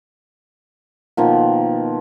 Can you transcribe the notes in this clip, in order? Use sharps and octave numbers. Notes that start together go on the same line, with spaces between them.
B2 D#3 F3 A#3